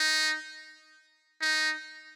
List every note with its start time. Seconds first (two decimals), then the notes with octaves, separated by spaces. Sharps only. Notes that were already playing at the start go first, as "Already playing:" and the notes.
Already playing: D#4
1.42 D#4